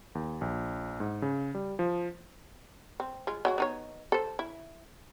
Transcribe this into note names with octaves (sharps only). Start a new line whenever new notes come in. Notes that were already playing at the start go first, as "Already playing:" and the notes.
D#2
A#1
G#2
C#3
G3
F3
C4
G#3 F4
F#3 G#3 F#4
B3 D#4 C#5
A4 C5
E4